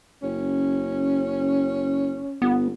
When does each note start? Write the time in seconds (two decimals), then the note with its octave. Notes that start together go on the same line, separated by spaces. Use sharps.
0.23 F#1 C#4
2.42 G1 B3